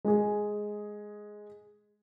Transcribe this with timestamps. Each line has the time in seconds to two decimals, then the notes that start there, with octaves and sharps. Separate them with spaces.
0.05 G#3 G#4